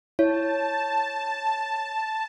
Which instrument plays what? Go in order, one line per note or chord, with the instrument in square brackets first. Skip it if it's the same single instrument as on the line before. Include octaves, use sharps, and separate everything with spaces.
[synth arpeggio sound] E4 [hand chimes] C#5 [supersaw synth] A5